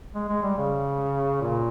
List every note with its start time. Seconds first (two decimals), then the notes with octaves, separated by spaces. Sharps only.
0.14 G#3
0.29 G#3
0.43 G3
0.57 C#3
1.41 A#2